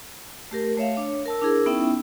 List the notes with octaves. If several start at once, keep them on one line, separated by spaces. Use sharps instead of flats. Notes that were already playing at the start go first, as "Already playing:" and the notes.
A3 G4 A#4
A3 C#5 E5 F5
D4 C#5
A#4 A5 E6
D4 E4 G#4 A#4
B3 C#4 D#4 E4 E5 G5